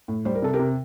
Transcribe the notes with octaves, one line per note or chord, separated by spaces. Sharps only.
A2
G3 C5
A#4
C3 A4
G4 A#4
C3